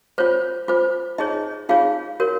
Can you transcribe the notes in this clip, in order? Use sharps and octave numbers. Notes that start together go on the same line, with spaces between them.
F4 C5 C#5
F4 C5
D#4 G#4 C#5 D#5
D#4 F4 G#4 C#5 F5
F#4 A#4 C#5